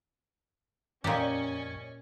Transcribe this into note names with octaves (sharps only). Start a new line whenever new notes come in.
F2 A#2 C#4 G4 D5 D#5 G#5 C#6